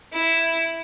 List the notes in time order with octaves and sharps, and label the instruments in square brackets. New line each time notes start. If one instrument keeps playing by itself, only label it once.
[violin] E4